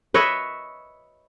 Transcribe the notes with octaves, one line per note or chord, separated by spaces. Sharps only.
B4 C#5 D#5 E5